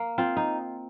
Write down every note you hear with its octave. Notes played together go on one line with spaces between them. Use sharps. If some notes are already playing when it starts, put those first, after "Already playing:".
Already playing: A#3
C4 F4
D#4